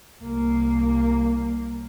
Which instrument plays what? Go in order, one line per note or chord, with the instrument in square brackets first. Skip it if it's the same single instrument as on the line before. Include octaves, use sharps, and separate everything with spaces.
[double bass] C2 A#3